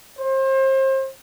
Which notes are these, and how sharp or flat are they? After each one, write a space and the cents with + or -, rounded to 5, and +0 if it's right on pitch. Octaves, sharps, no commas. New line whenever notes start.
C5 +35